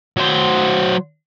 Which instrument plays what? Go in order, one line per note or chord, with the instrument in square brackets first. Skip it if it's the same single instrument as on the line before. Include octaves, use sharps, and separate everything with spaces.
[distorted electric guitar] F#3 C5